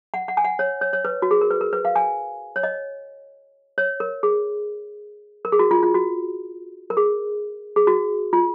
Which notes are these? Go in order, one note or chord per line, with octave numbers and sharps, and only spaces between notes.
F#5
F#5
G#5
F#5
C#5
C#5
C#5
B4
F#4
G#4
A#4
B4
A#4
B4
F5
G#5
C#5
D#5
C#5
A#4
G#4
A#4
G#4
F#4
F4
F4
F#4
A#4
G#4
G#4
F#4
F4